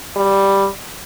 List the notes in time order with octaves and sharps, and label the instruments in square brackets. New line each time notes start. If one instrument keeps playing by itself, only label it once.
[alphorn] G3